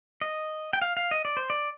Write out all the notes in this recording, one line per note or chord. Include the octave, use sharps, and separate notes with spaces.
D#5
G5
F5
F5
D#5
D5
C5
D5